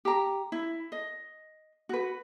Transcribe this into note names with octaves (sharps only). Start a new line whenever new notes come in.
G4 A#5
E4
D#5
F#4 B4